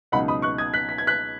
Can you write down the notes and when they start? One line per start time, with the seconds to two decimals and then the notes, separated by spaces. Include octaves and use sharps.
0.12 C#2 B2 F#3 D#4 F#5 B5
0.28 B5 D#6
0.42 C#6 F#6
0.58 D#6 G#6
0.73 F#6 B6
0.89 B6
0.98 G#6
1.07 F#6 B6